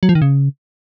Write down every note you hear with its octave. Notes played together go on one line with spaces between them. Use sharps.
F#3
F3
D#3
C#3